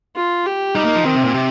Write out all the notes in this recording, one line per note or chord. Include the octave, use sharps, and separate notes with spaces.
F4
G4
G3 D#4
A#3
F3
D#3 C4
C3
A#2
C3